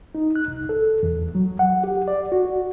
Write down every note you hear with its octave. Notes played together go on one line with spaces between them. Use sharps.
D#4
F#6
C2
A4
E2
F#3
F#5
G4
D5
F#4